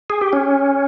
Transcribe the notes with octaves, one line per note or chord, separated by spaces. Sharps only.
G#4
G4
C#4